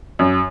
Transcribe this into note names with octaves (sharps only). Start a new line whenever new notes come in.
F#2